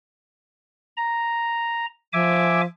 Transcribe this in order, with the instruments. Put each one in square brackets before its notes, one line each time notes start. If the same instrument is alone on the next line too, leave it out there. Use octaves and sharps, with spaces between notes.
[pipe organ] A#5
[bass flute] F3 [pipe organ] E5 G#5 D6